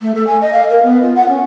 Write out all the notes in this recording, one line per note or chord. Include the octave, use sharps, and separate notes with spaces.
A3
A4
G#5
D#5
F5
A#4
B3
F4
F#5
C#4